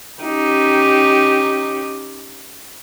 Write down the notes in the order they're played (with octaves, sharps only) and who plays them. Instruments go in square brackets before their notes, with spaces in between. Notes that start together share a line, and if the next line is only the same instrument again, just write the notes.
[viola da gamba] C#4 D#4 G4